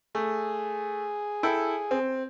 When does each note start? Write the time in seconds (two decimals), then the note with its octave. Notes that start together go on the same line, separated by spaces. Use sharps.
0.15 A3 G#4
1.43 E4 A4 G5
1.91 C4